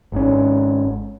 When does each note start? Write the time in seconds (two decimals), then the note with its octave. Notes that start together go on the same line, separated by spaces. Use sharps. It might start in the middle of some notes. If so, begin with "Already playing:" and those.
0.12 G#1 G#2 C#4